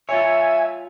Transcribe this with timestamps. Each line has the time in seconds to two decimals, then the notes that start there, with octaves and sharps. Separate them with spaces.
0.09 F4 C#5 E5 G#5